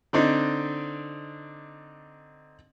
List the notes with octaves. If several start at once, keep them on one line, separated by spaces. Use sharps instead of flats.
D3 C4 D4 D#4